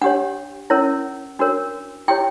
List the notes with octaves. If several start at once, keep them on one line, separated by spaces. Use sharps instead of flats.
D4 G4 C#5 F#5
C#4 E4 A#4 C#5
D4 F#4 A#4 C#5
E4 G4 C#5 G5